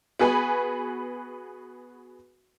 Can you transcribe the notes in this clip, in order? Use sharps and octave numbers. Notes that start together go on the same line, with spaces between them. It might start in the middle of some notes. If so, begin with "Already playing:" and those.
B3 F#4 G#4 B4 G#5 B5